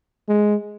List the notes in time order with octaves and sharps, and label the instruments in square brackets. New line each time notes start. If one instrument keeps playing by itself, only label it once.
[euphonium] G#3